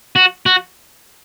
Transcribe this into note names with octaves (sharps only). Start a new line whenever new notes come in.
F#4
F#4